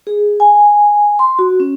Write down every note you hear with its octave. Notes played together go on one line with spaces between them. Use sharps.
G#4
G#5
C6
F#4
C#4